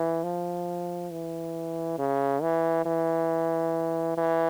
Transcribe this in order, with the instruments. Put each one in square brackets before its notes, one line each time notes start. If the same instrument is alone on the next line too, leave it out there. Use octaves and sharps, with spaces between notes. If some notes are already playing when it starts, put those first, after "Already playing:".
Already playing: [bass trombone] E3
F3
E3
C#3
E3
E3
E3